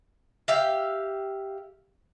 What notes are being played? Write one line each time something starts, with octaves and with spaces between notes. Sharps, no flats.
G4 E5 F5